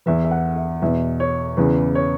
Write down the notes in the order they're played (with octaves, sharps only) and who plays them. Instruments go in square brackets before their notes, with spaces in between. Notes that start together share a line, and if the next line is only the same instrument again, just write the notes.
[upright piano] E2 E3 E5
E5
F#5
E5
E2 B2 E5
C#5
E2 C#3 E3 B4
C#5